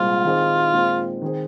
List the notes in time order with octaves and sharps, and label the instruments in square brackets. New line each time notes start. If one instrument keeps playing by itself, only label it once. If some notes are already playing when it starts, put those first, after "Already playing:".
Already playing: [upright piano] C2 A#2 G#3 C4 G#4 [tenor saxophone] F4
[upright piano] D#3 C4 D#4 G#4 C5
A#2 G#3 C4
D#3 C4 G#4 C5